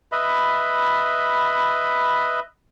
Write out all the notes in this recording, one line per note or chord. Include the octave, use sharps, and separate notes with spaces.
B4 D#5 E5 B5